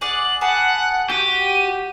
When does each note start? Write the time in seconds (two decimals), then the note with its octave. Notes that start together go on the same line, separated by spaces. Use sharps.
0.01 G#4 D5 F#5 F#7
0.41 G#4 F#5 A5 B5
1.10 F#4 G4 D#7